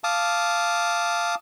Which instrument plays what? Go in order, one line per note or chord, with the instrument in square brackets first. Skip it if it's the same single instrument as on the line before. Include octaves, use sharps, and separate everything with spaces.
[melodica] F5 A5 D6 D#6